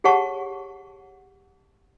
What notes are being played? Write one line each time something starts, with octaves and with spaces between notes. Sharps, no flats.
G4 G#4 C#5 F#5 A5 C#6